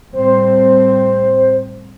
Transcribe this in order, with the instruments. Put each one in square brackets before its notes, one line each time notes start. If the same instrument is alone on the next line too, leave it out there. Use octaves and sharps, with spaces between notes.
[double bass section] A2 G3 C4 [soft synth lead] C5